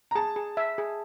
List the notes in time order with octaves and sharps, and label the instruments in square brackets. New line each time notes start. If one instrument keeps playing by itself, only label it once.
[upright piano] A#5
[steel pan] G#4 [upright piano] A5
[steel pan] G#4
E5
G#4